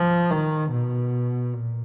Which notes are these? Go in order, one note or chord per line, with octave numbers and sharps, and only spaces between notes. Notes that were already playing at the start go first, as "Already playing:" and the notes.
Already playing: F3
D#3
B2
A#2